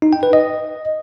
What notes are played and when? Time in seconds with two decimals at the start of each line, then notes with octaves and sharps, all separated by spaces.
0.02 D#4
0.13 G5
0.23 B4
0.33 D#5